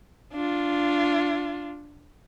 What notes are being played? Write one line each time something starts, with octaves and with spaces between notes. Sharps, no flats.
D4 F4